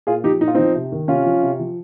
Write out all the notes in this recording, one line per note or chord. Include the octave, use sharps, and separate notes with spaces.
A#2 F4 G#4
F3 D#4 G4
A#2 D#4
F4
F3 C4 D#4
C3
D#3
C3 C#4 F4
F3
C3
F3